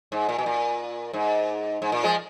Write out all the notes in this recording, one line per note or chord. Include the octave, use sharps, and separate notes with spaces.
G#2
A#2
B2
A#2
G#2
G#2
A#2
F3 G#3